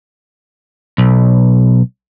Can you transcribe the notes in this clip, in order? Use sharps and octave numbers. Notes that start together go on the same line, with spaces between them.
B1